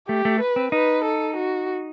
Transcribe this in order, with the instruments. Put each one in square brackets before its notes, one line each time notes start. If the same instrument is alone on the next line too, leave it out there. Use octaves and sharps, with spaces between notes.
[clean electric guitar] A3 [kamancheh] G4
[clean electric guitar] A3
[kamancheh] B4
[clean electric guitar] C4
[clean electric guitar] D#4 [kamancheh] B4
[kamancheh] A4
F#4